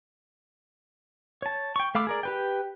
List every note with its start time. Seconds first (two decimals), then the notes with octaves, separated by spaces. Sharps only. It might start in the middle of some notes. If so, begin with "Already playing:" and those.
1.42 C#5 A5
1.76 G5 C#6
1.95 A3 F5 B5 D6 E6
2.07 G#4 A#4 D5
2.23 G4 B4 G5